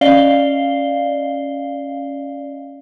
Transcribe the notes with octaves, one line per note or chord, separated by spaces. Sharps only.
C#4 D5 D#5 F5 C7 G7